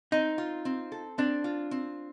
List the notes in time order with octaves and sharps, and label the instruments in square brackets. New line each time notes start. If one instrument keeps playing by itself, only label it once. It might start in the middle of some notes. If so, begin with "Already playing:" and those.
[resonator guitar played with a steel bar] C4 [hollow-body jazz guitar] D#4
[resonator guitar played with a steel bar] F4
C4
A4
[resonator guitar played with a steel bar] C4 [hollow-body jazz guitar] D4
[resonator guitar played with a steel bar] F4
C4